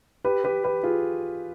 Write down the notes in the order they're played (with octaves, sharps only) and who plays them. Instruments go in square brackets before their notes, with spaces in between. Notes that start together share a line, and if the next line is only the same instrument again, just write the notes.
[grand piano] G4 B4
G4 B4
G4 B4
F4 G#4